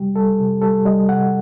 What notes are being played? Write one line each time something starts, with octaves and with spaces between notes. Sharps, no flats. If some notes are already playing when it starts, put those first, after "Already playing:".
Already playing: C3 G3 G4
G3 A4
C3
G3 A4
G3 D#5
C3 F#5